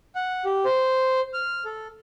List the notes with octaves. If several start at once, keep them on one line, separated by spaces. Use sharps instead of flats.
F#5
G4
C5
F6
A4